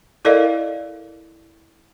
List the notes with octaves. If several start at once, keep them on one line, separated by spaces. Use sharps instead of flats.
E4 A4 A#4 D5 D#5 F5